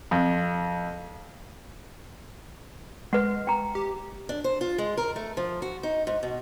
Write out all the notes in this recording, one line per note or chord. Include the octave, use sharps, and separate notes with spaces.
F2
G#3 B4 F#5
G5 A#5
G4
D4
C5
F4
G#3
A#4
A3
F3
F#4
D#4
G#2
B2